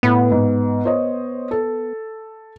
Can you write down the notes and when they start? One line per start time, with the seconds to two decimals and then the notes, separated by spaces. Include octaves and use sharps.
0.03 A2 B3
0.31 G#2
0.85 C5 C#5 D#5
1.51 A4